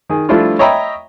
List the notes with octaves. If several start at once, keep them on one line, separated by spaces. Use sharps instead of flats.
D#3 G#4
F3 G3 A3 D4 E4 F4
C#5 D#5 E5 G5 A#5 B5